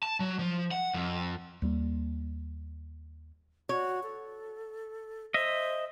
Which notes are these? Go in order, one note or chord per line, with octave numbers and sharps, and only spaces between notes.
A5
F#3
F3
F#5
F2
D#2 G3 A#3
F#4 C#5
A4
C5 D#5 E5